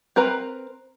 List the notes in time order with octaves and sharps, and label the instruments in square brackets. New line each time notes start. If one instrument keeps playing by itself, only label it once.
[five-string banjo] C4 A#4 B4 A#5